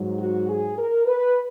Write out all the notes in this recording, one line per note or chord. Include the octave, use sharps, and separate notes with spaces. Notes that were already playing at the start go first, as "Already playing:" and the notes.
Already playing: G#2 F#3
F#4
G#4
A#4
B4